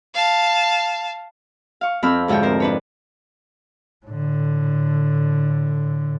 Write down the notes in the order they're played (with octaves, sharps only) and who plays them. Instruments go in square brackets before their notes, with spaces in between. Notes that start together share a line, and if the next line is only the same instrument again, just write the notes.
[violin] F5 A5
[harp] F5 C#6
F2 C4 B5 E6 F6
D2 G#2 F3 C#5 G5
A#4 C5
D4 B4 C#5
[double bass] A2 D3